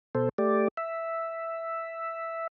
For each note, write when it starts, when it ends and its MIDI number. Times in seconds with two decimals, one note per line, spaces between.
0.15 0.29 47
0.15 0.29 69
0.15 0.29 72
0.38 0.68 57
0.38 0.68 67
0.38 0.68 74
0.77 2.47 76